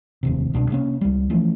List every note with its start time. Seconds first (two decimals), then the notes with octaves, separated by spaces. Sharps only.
0.23 F1 D#2 C3
0.54 C2 B2 F#3 D4
0.70 C3 A#3 C#4
1.01 C#2 G3
1.30 E3 F3 A3 C#4